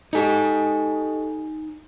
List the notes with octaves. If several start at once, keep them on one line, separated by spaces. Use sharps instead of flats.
D#4 G4 A4 D#5 G#5